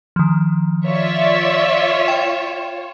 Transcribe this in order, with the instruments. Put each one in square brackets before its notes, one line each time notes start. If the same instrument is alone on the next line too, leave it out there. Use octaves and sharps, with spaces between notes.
[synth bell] D#3 F3
[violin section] F4 C#5 [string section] D5 E5
[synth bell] G5 E7